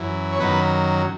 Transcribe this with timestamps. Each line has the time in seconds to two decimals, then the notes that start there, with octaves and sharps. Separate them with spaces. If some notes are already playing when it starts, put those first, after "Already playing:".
Already playing: F#2 E3
0.33 C#5
0.40 F#2 D#3 F#3 B3 B4